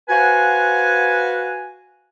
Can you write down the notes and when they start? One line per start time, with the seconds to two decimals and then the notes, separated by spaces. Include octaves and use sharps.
0.09 F#4 B4 C5 F5 F#5 G#5